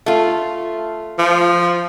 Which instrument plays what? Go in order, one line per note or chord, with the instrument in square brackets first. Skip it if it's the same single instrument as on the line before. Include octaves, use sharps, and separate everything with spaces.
[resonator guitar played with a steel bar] A3 F4
[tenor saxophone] F3